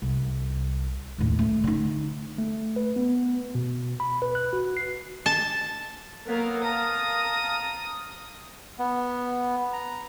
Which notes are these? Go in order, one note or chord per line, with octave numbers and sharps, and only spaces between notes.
C2
D#2 A2
A3
D3 D#4
A3
B4
B3
B2
B5
B4
F#6
F#4
C7
A5
F#3 A#3 B3 A#4
F5 A5 A#5 D#6
B3
A#5